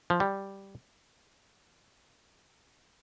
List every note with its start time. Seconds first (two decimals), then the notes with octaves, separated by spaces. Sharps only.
0.10 F3
0.20 G3